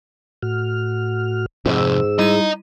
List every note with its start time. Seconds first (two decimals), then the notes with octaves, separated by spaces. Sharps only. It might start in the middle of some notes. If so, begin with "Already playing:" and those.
0.43 A2 F#4 F6
1.66 F2 G#2 C3 E6
2.19 G3 E4 D#5 A#5 D#7